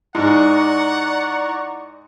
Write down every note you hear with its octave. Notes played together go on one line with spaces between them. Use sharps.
G#2 E4 D5 F#5 A#5 C#6